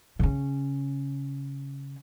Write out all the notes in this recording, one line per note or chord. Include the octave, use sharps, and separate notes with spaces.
C#3 C#4